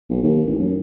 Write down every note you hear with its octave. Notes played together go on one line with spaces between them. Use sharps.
B1
D#2
A1
F#2